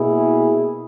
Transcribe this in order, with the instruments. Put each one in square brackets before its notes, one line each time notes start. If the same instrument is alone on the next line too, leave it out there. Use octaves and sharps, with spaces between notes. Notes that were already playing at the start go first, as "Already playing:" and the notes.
Already playing: [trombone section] B2 A#3 E4 G#4